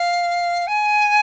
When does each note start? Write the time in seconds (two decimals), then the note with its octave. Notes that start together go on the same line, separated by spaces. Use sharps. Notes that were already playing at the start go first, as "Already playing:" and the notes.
Already playing: F5
0.67 G#5